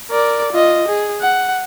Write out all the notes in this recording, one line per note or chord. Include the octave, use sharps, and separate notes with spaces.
A#4 D5
F4 D#5
G#4
F#5